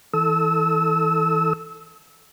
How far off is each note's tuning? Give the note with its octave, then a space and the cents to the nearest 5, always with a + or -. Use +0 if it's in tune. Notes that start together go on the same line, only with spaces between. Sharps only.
E3 -20 A4 +0 E6 -30